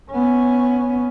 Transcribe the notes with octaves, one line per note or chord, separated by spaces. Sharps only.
B3 C#4